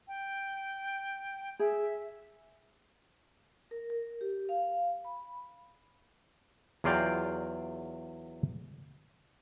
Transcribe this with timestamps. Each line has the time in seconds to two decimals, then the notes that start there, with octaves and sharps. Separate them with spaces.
0.08 G5
1.59 G#4 E5
3.71 A#4
3.90 A#4
4.21 G4
4.49 F5
5.05 B5
6.84 E2 F#3 F4 D5 F5 G5